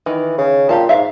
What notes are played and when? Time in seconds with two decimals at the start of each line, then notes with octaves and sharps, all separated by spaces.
0.06 D#3 E3
0.38 C#3
0.69 A#2 G4 F5 A5
0.89 G#2 E5 F5